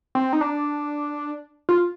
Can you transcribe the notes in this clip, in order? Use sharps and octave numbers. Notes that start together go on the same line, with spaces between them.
C4
D#4
D4
F4